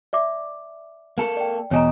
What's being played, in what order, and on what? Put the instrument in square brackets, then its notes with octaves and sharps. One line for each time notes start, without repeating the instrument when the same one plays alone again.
[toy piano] D5 E5 D6
[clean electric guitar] A#3 A4
[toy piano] D5 G5
[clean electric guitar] E2 B2 D#5 [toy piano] C#5 G#5 A#5